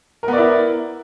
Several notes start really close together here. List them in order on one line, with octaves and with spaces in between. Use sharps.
A#4 B3 D5 E4